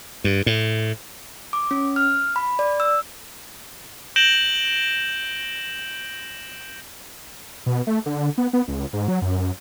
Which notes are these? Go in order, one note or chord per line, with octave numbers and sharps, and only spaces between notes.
G2
A2
D6
C#4
F6
B5
D5
E6
G6 A#6 D7 E7 F#7 G7
B2
A3
D3
B3
B3
C#2
G#2
F#3
F#2
F#2